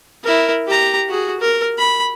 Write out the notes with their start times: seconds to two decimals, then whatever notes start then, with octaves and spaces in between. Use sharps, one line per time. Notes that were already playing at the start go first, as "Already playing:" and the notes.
0.24 E4 A#4
0.67 G4 A#5
1.09 F#4 G#4
1.40 A#4
1.78 B5